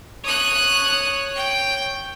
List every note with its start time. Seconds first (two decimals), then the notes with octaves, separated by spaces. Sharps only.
0.25 C#5 D#6 F#6
1.36 G5